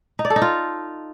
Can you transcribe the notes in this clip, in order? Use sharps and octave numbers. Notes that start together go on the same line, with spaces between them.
D#4
D5
A4
D#4
F4